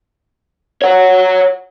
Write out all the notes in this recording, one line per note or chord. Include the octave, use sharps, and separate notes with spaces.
C#5 F#5